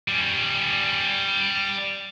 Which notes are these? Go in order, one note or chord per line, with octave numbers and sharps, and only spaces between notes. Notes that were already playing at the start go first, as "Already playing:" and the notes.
G3 C#4